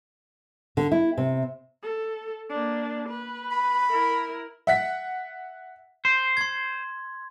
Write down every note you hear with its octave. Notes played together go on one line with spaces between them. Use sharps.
D3
E4
C3
A4
A#3 D4
B4
B5
E4 A#4
E5 F#5 B6
C5
C6 G#6